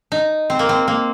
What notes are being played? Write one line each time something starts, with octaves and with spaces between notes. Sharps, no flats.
D#4
C4
A#3
C4
A#3